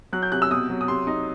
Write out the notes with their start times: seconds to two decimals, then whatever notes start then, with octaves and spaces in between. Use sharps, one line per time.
0.13 F#3 F#6
0.23 G6
0.32 C3 F#6
0.42 E6
0.51 B2 D#6
0.70 F#3
0.81 D#6
0.88 C3 C6
1.07 D#4